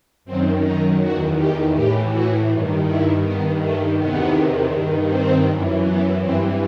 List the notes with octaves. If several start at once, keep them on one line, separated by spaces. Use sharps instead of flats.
F#2 D#3 C4
D#4
E2 D#3 F#4
G4
A2 E3 G4
F#4
G2 D#3
E4
G2 D#3 B3
A3
E2 C3 D#3 B3
G2 D#3
C4
F#2 E3
B3
G2 E3 C4